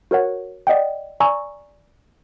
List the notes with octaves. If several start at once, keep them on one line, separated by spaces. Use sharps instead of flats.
F#4 A#4 C#5 F#5
D5 D#5 F#5 G5
D5 G#5 A#5 C#6 E6